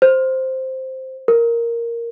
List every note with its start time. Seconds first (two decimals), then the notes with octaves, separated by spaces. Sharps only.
0.02 C5
1.28 A#4